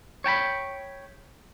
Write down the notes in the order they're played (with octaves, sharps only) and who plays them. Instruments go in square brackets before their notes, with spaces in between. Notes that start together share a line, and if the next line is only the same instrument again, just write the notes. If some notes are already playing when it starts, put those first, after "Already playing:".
[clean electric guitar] C#5 G5 A5 B5